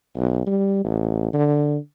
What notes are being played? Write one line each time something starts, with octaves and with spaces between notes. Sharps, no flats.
B1
G3
A1
D3